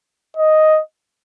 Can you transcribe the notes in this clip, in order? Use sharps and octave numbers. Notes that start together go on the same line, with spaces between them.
D#5